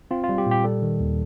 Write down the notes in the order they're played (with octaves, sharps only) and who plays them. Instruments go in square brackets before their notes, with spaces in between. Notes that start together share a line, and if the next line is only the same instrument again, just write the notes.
[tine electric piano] C4 F4
F4
G3
G4
A#2
G4
G3 A4
D#3
D#2